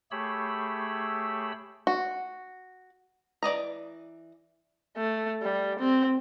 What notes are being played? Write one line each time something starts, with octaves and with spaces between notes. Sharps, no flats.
A3 G4 G#4 C#5 B5 E6
F#4
E3 D5 D#5 A#5
A3
G3
C4